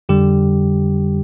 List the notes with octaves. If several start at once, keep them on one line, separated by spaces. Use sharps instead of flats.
F2 D3 G3 G4